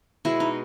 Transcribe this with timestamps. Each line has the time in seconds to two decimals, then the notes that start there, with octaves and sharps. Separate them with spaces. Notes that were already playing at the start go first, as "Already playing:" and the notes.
0.25 B2 G#3 B3 E4
0.40 D#4